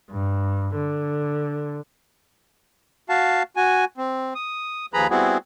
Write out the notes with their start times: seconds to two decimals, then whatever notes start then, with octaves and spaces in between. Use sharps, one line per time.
0.11 G2
0.75 D3
3.09 F#4 F5 A5
3.56 F#4 G#5
3.97 C4
4.35 D#6
4.94 D#2 F3 G#4 B4 A#5 B5
5.10 G3 B3 C4 E4 F#4 G#4